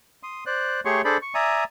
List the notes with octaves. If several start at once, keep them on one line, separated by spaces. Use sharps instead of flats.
C6 D#6
C5 D5 F#6
A3 G4 G#4 C#5 C6 C#6
D4 G#4 A4 C5 D5 B5
C#6
D5 E5 G#5 A#5 D#6